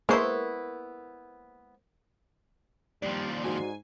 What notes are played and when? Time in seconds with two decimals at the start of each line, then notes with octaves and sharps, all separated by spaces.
0.09 G#3 A#3 B3 E4 A#4 C5 C#6
3.02 D#2 F3 G3 D5
3.44 G#2 F#4 D5 G#5